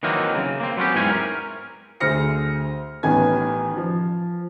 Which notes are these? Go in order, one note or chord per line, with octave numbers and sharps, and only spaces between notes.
D#3 E3 F#3 A#3 C4 D#4
C#3
A#3 C4
F#3 B3 C#4 G4
E2 G#2 E3 C4 C#4 G#5
A#4
D2 G#4 C5 F6 A#6 C#7
A1 D#3 B3 G#5 G#6
F3